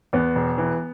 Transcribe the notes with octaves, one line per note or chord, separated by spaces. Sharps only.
E2 B3
E1
E3